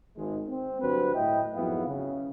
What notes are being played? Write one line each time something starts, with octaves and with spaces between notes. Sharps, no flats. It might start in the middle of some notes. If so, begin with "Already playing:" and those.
G#1 G#3
C4
D2 G2 F#3 B4 C5
A2 E4 D#5 G5
F2 G#2 F#3 B3 E4 F5
C#3